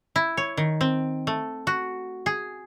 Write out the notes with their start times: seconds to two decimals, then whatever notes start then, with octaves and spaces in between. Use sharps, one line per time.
0.16 E4
0.37 C#5
0.57 D#3
0.81 C4
1.27 A3
1.67 F#4
2.26 G#4